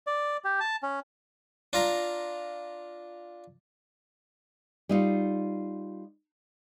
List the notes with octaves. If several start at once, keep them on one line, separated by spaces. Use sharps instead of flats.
D5
G4
A5
C#4
D4 F4 A#5
G3 D#4 F4